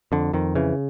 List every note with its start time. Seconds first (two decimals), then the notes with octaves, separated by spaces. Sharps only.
0.12 F2 D3
0.33 F2 D#3
0.55 C#3 E3